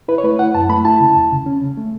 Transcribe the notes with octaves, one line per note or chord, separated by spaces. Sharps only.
E4 B4
C#5
A3 B4
E4 F#5
F#2 A5
A3 B5
E4 A5
C#3
E2
C#3
C#4
C#3
A3